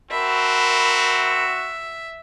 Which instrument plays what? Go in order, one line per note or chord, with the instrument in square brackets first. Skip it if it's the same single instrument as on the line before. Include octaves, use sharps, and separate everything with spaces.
[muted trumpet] C4 [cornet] F#4 [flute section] A#4 A5 B5 [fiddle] E5